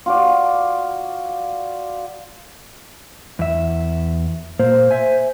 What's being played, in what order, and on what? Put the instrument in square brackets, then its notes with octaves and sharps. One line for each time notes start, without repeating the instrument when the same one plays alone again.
[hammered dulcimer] F4 F#4 D5
[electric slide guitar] E2 E5
[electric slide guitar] A#2 A#3 [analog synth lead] C5
[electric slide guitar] E5 G#5